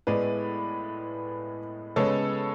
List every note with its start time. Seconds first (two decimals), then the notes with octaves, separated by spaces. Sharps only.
0.07 A2 G#3 B3 B4 D5
1.96 C#3 G#3 B3 A4 C#5